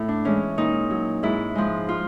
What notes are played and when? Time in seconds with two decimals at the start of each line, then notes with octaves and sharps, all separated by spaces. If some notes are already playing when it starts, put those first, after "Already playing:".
Already playing: A2 E4
0.09 D4
0.25 E3 G#3 C#4
0.57 A#2 D#4
0.90 F#3
1.23 G#2 E4
1.55 F3 G#3
1.89 F4